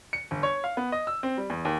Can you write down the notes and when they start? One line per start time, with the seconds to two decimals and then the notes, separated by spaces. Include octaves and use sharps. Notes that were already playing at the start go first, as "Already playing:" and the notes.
0.13 C#7
0.31 G1
0.43 C#5
0.64 F5
0.77 B3
0.92 D#5
1.07 E6
1.23 C4
1.38 G3
1.50 E2
1.65 D#2